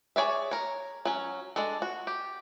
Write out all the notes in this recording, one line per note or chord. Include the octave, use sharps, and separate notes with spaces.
G#4 C#5 D5 E5
A#4 C#5
F#3 C#4
G#3 D4 A4
F#4
G4